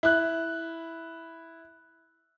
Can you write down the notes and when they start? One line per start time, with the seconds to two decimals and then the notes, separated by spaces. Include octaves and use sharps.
0.03 E4 F#6